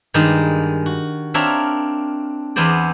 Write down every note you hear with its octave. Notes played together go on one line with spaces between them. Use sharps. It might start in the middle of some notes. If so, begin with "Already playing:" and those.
G2 D#3 G#3
F#4
C4 D4 A#4 C#5 E5 F5
E2 E3 B3 C5 D5